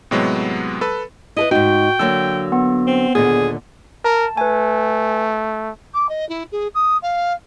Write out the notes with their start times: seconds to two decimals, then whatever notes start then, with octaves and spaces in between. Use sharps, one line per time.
0.11 A2 C3 F#3 G#3 B3
0.81 A4 B4
1.36 E4 A4 B4 D#5
1.51 G#2 D#4 F#4 G5
1.99 D3 F#3 A#3 E6
2.52 B3
2.87 C4
3.15 D#2 A#2 D3 G#4
4.05 A#4 A5
4.37 A3 B4 G#5
5.94 D6
6.09 D#5
6.29 E4
6.52 G#4
6.75 D#6
7.02 F5